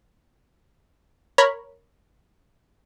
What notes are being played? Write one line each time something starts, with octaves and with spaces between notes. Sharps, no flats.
A#4 C#5 A#5 B5